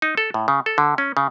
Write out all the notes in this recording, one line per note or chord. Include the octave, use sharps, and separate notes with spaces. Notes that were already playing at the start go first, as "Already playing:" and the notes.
D#4
A4
A2
C#3
A4
D3
C#4
C#3